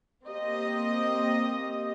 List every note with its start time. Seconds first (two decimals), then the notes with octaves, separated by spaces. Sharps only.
0.24 A#3 C4 G4 D#5